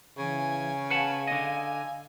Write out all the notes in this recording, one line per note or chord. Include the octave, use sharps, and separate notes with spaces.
C#3 E3 G#5
B4 F5 F#5 G#5 A5
D3 D#5